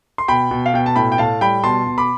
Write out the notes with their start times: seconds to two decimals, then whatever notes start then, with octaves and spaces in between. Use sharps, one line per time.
0.18 C6
0.28 B2 G5 B5
0.51 B2
0.66 F5
0.74 B2 G5
0.86 A5
0.96 A2 G5 B5
1.12 G5
1.18 A2 F5 A5
1.41 G3 G5 B5
1.64 B2 A5 C6
1.86 B2
1.98 B5 D6